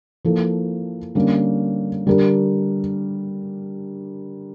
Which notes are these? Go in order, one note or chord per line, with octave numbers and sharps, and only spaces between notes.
F3 A#3 E4 A4
D3 G3 A#3 C#4
D3 G3 D4 G4 A#4